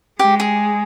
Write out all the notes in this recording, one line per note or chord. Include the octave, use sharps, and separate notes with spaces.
G#3 G4
G#4